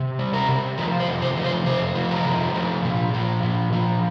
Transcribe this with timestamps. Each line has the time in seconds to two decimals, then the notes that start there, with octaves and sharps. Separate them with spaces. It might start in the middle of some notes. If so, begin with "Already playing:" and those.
Already playing: C3
0.19 G3
0.33 A#4
0.49 C3
0.78 F3 A#4
1.00 C5
1.08 C3
1.22 C5
1.36 F3
1.44 C5
1.66 C3 C5
1.95 F3
2.11 A#4
2.25 C3
2.54 F3
2.84 A#2
3.13 F3
3.43 A#2
3.73 F3